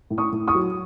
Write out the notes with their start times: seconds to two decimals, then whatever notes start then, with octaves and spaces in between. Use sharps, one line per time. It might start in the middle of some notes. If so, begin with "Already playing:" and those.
0.10 A2
0.18 C#6 D#6
0.33 A2
0.48 C#6 D#6
0.55 F#3